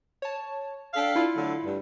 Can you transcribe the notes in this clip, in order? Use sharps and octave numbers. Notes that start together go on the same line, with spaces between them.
C#5 A5
D4 A4 F5 G5 B6 C7
E4 F4
D3 F#3 A3
G2